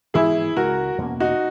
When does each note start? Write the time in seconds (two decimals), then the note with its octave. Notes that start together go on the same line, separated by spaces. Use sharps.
0.14 G#2 E3 G#3 B3 E4 G#4
0.56 C#2 C#3 G#3 F#4 A#4
0.98 E2 B2 A#3 C#4
1.20 D#4 F#4